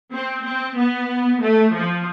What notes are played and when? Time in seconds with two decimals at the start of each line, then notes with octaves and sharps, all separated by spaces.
0.13 C4
0.45 C4
0.77 B3
1.42 A3
1.75 F3